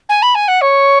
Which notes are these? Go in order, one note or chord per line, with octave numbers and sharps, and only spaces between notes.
G#5
B5
G#5
F#5
C#5